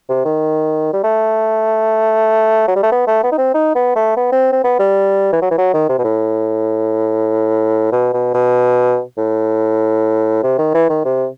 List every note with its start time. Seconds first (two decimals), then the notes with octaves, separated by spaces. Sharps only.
0.09 C3
0.25 D#3
0.93 G3
1.03 A3
2.67 F#3
2.75 G3
2.83 A3
2.92 B3
3.07 A3
3.23 B3
3.32 D#4
3.38 C4
3.54 D#4
3.75 B3
3.96 A3
4.16 B3
4.32 C4
4.52 C4
4.64 B3
4.79 G3
5.32 E3
5.42 F#3
5.51 E3
5.58 F#3
5.73 D#3
5.89 C3
5.98 B2
6.04 A2
7.92 B2
8.13 B2
8.34 B2
9.18 A2
10.43 C3
10.58 D#3
10.74 E3
10.89 D#3
11.05 C3